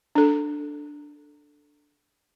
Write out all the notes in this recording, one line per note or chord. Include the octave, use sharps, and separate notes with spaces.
D4 A4